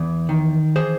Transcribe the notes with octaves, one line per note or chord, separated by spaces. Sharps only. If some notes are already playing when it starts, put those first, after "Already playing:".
Already playing: E2
D#3
E3 G#4 C5